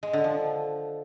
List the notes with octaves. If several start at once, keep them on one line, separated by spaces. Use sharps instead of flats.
G#3
D3
F3